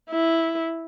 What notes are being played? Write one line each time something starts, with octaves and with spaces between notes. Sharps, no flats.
E4